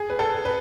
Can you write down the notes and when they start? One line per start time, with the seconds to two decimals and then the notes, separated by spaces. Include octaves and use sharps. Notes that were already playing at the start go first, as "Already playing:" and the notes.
Already playing: G#4
0.10 B4
0.19 A4
0.45 B4